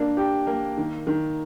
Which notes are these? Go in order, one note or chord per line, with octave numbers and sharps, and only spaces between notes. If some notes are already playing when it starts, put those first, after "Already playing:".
Already playing: A#3 D4
G4
A#3
D#3
D#3